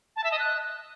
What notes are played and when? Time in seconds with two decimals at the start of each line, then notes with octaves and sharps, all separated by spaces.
0.16 A5
0.24 E5
0.32 D#5
0.39 F#6